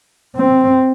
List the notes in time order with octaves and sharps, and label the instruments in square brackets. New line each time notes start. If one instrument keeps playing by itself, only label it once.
[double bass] C4